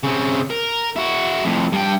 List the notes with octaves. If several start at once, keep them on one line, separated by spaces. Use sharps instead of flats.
C#3 C4
A#4
E4 F#4
F2 A2
G2 G5